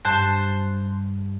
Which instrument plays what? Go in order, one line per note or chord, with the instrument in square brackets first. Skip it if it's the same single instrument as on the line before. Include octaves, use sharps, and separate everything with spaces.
[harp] G2 [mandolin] C5 A5 F#6